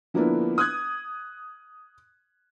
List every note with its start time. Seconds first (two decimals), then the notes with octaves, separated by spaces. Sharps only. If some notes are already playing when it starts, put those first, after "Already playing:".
0.14 D3 F3 A#3 B3 D4 E4
0.58 D#6 F#6 G#6